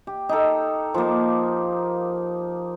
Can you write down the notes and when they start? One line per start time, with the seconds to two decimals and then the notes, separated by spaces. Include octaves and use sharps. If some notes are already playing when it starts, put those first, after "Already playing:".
0.07 G4
0.29 D#4 A4
0.94 F3 A#3